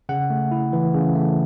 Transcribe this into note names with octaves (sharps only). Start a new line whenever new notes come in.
C#3 F#5
A3
E4
E3
C#3
A3